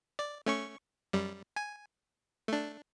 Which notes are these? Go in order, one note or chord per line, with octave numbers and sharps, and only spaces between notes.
D5
A3 C#4 C#6
F#2 G3
G#5
A3 D4